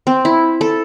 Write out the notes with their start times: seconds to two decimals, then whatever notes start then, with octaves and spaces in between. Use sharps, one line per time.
0.07 C4
0.25 E4
0.61 A4